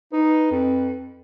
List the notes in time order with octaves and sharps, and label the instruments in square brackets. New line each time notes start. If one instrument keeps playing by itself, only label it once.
[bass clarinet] D#4 [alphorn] B4
[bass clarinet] F2